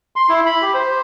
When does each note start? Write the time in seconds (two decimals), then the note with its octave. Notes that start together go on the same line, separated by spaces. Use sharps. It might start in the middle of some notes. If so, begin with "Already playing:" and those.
0.16 C6
0.29 E4
0.46 B5
0.62 G4
0.74 C5